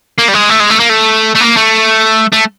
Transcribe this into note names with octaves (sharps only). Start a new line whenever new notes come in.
A#3
G3
G#3
A3
G#3
A3
A#3
A3
A3
A#3
A3
A3